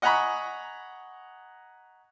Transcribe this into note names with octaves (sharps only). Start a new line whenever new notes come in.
D#5 F#5 G#5 A#5 B5 C#6